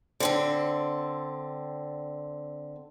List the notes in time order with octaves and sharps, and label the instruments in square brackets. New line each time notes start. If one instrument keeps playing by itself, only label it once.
[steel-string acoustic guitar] D3 C4 A4